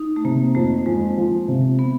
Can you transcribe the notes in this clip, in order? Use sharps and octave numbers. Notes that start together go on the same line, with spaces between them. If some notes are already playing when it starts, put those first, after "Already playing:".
Already playing: D#4
A3
C3 A#3
F2 A3
F2 G#3
F3
C3
B3